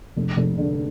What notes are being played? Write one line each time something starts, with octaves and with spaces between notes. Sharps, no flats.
F1
F1
D3